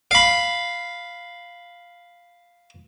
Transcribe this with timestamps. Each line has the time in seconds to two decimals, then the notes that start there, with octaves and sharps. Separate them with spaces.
0.11 F5 B5